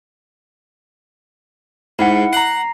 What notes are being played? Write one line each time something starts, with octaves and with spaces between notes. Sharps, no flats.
G#2 E4 F#5
F#5 A#5 C7